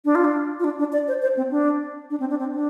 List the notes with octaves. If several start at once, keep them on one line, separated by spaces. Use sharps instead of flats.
D4
F4
D4
F4
D4
D4
D5
C5
C5
C4
D4
D4
C4
D4
C4
D4